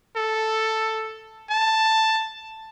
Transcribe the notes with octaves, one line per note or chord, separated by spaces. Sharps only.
A4
A5